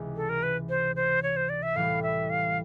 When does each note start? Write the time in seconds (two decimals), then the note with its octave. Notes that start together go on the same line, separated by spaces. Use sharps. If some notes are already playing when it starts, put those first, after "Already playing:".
Already playing: C#2 C3 E3 G#3
0.16 A4
0.29 A#4
0.43 B4
0.69 C5
0.96 C5
1.23 C#5
1.36 C5
1.49 D5
1.63 E5
1.75 A2 E3 G3 F5
2.03 E5
2.30 F5